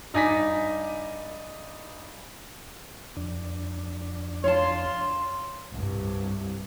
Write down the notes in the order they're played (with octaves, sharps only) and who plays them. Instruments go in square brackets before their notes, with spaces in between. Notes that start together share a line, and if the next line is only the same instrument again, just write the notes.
[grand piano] G2 D#4 D5 G#5 A#6 B6
[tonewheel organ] F2 D4
[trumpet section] F4 C6 [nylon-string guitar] C#5 A5
[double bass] C2 G2